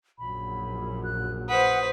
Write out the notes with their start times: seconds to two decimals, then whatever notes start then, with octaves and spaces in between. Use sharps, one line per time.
0.19 A#1 F#2 B5
1.04 F#6
1.49 B4 C5 F#5 D#6